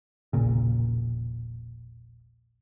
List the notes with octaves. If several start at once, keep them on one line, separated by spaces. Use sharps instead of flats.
E1 A#1 A#2 C#3